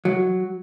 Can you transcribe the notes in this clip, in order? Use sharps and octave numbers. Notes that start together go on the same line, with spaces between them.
F#3